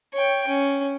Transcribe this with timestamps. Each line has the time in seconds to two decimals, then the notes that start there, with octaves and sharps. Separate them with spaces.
0.14 C#5 G5
0.47 C#4